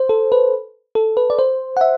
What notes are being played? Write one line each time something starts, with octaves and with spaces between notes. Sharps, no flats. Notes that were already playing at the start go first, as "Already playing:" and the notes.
Already playing: C5
A4
B4
A4
B4
D5
C5
F#5
E5